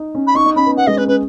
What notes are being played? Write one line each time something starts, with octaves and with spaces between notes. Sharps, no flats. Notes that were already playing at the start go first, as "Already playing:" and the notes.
Already playing: D#4
C#4
B5
D#4 C#6
D#4
C#4 B5
B3
B3 F#5
G#3 D#5
C#4 B4
C#4 B4